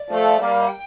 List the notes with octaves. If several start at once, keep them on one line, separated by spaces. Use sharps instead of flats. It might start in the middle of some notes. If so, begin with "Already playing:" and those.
Already playing: D5
F3 A3
G3 A#3
G5